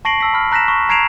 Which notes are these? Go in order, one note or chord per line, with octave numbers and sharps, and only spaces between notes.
A5 C#6 A#6 C7 D7 F#7
A5 E6 B6
B5 F6
A#5 F#6 A#6 B6 E7
C#6
A#5 G#6 C7 D7 E7 F7